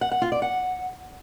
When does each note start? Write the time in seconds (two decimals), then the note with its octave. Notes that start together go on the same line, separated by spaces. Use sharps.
0.01 F#5
0.11 F#5
0.22 F4
0.32 D5
0.42 F#5